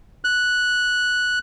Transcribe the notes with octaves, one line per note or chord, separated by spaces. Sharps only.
F#6